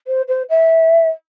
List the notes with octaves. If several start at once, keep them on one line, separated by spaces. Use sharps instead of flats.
C5
C5
E5